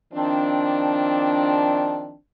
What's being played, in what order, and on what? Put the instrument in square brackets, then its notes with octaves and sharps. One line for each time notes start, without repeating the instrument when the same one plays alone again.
[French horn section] D#3 F3 C4 D4